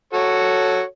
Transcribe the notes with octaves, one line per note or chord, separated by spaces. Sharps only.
F#4 A4 C#5